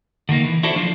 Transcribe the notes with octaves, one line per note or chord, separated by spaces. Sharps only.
D3 D#3 A#3 D#4
E3
E4 F#4 A4 C5 D5
F3 D4 F4